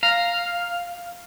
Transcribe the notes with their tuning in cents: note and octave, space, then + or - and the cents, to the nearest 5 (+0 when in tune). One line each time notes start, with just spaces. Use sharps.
F5 +0 A#5 +0